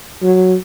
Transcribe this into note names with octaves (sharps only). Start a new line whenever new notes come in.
F#3